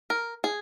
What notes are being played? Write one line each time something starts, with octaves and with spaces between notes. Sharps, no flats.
A#4
G#4